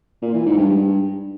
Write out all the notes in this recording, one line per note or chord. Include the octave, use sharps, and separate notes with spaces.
A#2
E3
G#2
G2
G2